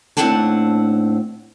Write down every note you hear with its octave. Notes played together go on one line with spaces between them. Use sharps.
D#2 A2 C4 D4 F#5 A5